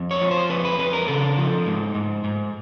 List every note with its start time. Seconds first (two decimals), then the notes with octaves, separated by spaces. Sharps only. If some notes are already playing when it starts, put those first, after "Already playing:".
Already playing: F2
0.11 C#5
0.21 F3
0.31 C5
0.50 F2 B4
0.65 B4
0.79 F2 B4
0.93 A#4
1.08 C#3 A4
1.37 F3
1.66 G#2
1.95 G#2
2.24 G#2